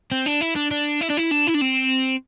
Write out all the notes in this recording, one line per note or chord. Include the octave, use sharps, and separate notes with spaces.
C4
D4
E4
D4
D4
E4
D4
E4
D4
E4
D4
C4